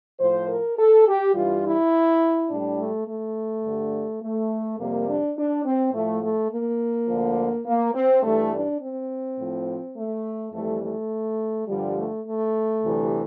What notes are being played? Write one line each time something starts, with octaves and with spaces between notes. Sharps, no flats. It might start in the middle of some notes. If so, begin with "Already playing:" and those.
A2 F3 C5
A#4
A4
G4
G2 E3 G3 F4
E4
A2 G3 D4
A3
A3
G2 D3 G3
A3
F2 C3 G3 A#3
D4
D4
C4
A2 F3 A3
A3
A#3
D2 D3 F3
A#3
C4
G2 E3 G3 A3
D4
C4
A2 F3
A3
F2 E3 G3 A3
A3
G2 D3 F3 G3
A3
A3
D2 C3 E3 G3